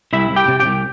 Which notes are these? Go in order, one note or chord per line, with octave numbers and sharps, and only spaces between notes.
C2 E4 E5
C2
G4 G5
C3
G4 G5
C2